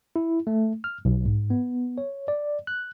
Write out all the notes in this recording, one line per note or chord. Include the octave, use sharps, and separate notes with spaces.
E4
A3
F6
B1
G#2
B3
C#5
D5
F#6